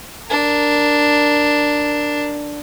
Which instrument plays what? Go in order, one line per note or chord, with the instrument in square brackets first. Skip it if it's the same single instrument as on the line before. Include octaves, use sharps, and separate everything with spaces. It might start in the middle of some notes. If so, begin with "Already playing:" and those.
[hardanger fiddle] D4 A#4